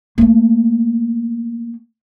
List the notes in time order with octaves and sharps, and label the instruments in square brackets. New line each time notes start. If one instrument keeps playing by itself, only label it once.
[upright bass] A3 A#3